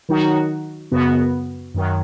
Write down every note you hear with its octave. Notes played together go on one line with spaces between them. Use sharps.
D#3 F#3 D#4 F#4
F#2 C#3 B3 F#4
F#2 D#3 F#3